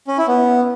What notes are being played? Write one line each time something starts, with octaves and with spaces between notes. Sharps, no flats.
C#4
E4
B3